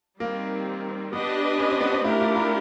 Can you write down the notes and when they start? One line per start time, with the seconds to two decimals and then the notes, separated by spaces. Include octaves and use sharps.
0.20 D#3 G3 A#3 C4
1.12 B3 D4 G4 B4 D#5
1.59 C#4
1.70 C4
1.81 B3
1.93 C4
2.04 A3 D4 E4 G4 A#4
2.20 F4
2.36 E4